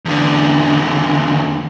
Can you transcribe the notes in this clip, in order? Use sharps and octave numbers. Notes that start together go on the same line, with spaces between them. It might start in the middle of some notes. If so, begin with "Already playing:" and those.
E2 D3